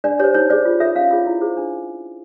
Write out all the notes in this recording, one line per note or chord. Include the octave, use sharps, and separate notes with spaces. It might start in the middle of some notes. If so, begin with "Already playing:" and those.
D4 D5
G4 C5 C#5
D#4 C#5
G#4 C5 D5
F4
A4 C#5 E5
C#4 F5
F4 G#4 C#5
E4
G#4 C5
D4